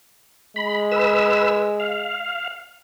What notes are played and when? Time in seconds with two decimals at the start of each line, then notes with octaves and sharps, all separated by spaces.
0.56 G#3 B5
0.92 B4 E6
1.80 F5